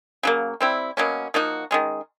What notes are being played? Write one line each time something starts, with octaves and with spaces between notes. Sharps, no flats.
C#3 F#3 A#3
G3 C4 E4
B2 F#3 A#3 C#4
F3 A#3 D#4 F#4
D#3 G#3 C#4